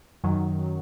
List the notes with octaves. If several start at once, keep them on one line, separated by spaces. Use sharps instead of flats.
F#2 D#3 F#3